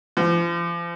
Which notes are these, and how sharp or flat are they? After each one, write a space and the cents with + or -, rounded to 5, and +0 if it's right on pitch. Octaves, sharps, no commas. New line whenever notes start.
F3 -40